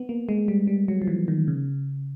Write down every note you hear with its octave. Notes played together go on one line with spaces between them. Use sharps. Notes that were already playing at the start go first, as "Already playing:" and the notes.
Already playing: B3
A#3
G#3
G3
G3
F#3
F3
E3
D#3
C#3